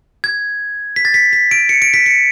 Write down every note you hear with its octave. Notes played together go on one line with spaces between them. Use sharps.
G#6
B6
A6
B6
B6
D7
C#7
D7
B6
C#7